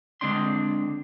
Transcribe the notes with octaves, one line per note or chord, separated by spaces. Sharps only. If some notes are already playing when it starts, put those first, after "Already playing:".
D3 G#3 C4 D4 C6